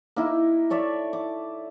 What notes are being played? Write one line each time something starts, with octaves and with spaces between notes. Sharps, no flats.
A#3 D#4 E4
A4 C#5 D5 E5
D6